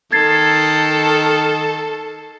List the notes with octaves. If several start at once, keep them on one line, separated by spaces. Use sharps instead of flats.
D#3 A4 G#6 A6 C7